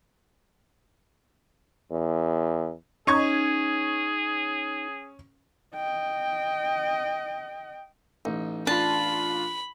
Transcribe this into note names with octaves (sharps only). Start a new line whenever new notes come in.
E2
C#4 D#4 G#4 C#6 G#6
D#5 G5
A1 D#4
D4 F4 A5 B5